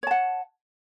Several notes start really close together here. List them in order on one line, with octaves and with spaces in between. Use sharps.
C#5 A5 F#5